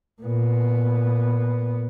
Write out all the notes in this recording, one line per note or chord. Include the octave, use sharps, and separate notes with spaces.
A#2 B3